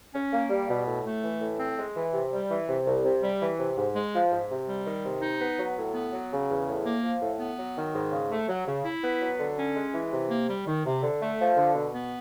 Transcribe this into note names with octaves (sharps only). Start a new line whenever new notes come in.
C#4
A#3
G3
B2
A2
A3
E3
A2
C4
G#3
E3
C3
G3
E3
C3
C2
C3
G3
E3
C3
G#2
G#3
F3
G#2
C3
G3
D#3
C3
D#4
B3
F#3
A2
B3
F#3
C#3
E2
A2
A#3
F3
A2
B3
F#3
D#3
G#2
C#3
A3
F#3
C#3
E4
B3
F#3
D3
C#4
G#3
E3
C3
A#3
G3
D#3
C3
D3
A3
F3
D3
B2
B3